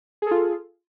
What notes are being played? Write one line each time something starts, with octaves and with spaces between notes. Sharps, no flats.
F4 G#4 A4